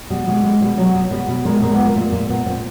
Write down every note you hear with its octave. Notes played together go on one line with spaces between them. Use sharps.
B2 G3
B2 G#3
B2 G#3
B2 G3
B2 F#3
B2
B2 G3
B2
A#2 G#3
A#2 G#3
A#2 B3
A#3
A#2 A3
A#2 A#3
A#2 B3
A#2 C4